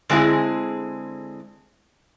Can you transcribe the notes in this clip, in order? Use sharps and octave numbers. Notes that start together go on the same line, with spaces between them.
D3 G#3 C4 E4 G#4